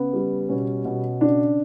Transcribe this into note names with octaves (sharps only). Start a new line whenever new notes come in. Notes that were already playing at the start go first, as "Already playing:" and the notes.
Already playing: C#3 B3
G3
B2 C#4
B2
C#3 D4